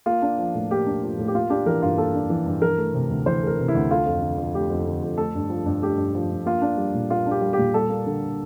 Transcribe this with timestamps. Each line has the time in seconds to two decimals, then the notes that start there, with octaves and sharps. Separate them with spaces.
0.06 A#3 F4
0.22 D4
0.39 F3
0.55 A2
0.71 A#3 G4
0.86 D4
1.03 F3
1.18 A2
1.28 G4
1.34 A#3 F4
1.50 D4 G4
1.66 E3 A#4
1.82 G2 F4
1.98 A#3 A4
2.14 D4
2.30 E3
2.46 G2
2.62 E3 A#4
2.78 A3
2.94 C3
3.10 D2
3.26 E3 C5
3.43 A3 A#4
3.59 C3
3.68 E4
3.75 D2
3.90 A3 F4
4.06 F2
4.22 D3
4.38 F2
4.55 A3 G4
4.70 F2
4.86 D3
5.03 F2
5.18 A3 A4
5.35 G2
5.50 F3
5.66 G2
5.82 A3 G4
5.98 G2
6.15 F3
6.30 G2
6.46 A#3 F4
6.62 D4
6.77 G3
6.94 A#2
7.10 A#3 F4
7.26 D4 G4
7.41 G3
7.53 G4
7.58 A#2
7.74 G3 A4
7.90 A#3
8.07 D3